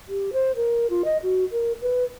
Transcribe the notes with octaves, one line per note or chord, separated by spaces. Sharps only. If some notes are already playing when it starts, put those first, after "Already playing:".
G4
C5
A#4
F4
D#5
F#4
A#4
B4